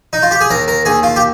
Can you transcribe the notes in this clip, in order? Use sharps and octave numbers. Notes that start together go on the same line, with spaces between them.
D#4
F4
G4
G#4
D#2 A#4
A#4
D#2 G#4
F4
G4